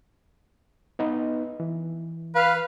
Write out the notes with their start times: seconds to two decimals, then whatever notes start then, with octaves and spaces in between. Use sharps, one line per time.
0.99 B3 D#4 B4
1.60 E3
2.35 B4 F5